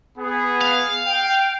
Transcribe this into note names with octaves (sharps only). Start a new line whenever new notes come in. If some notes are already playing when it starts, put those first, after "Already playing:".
B3 G#4
F5
G5